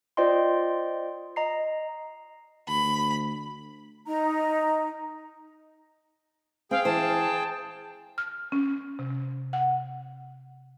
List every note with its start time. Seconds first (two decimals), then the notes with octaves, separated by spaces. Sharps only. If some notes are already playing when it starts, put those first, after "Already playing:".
0.17 F4 C5 D5 D#5 G5 C6
1.36 D#5 A#5 C7
2.68 D2 B5
4.05 D#4 A#5
6.71 C4 G#4 F5 G5
6.85 E3 C5 A5
8.18 F6
8.52 C#4
8.99 C3
9.53 F#5